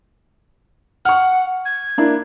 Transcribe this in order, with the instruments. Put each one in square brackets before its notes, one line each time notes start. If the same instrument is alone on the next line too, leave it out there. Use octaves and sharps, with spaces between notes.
[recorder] F#5 [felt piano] C#6 F6
[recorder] G#6
[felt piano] A#3 D4 E4